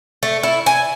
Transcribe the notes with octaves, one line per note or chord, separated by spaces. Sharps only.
A3
E4
G#5